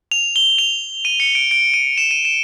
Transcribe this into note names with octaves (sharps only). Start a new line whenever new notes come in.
F7
G7
F7
D#7
C#7
D7
D7
D#7
E7
D#7
E7